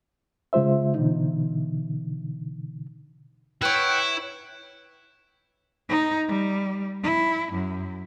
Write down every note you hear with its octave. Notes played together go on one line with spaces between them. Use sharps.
C#3 G#3 F4 C5 E5
B2 D3 E3 D#4
E4 B4 C#5 F#5 G5
D#4
G3
E4
F#2